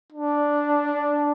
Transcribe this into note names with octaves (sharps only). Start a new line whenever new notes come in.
D4